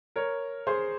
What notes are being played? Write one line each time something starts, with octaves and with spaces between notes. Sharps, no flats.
A#4 C#5
G#4 C5